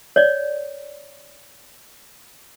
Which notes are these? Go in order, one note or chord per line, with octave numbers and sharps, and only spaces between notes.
C#5 D5